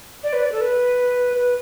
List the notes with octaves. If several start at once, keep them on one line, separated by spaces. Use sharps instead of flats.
D5
B4
D5
A4
B4
B4